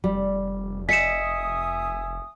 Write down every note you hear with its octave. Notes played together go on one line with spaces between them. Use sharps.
F1 G3
D#5 E5 G#5 D#6 B6 C#7 E7